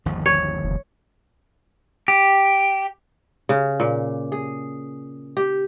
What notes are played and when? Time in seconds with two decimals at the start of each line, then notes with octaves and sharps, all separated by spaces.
0.05 G1 D#2 F3
0.26 C#5
0.64 F1
2.08 G4
3.49 C#3
3.80 A#2
4.32 G#4
5.37 G4